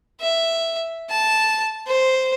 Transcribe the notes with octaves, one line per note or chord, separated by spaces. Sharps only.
E5
A5
C5